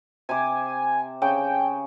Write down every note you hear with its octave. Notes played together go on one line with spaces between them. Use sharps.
C3 C5 G#5 D6
C#3 G5